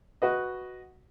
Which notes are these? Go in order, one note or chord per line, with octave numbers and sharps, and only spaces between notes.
F#4 B4 D#5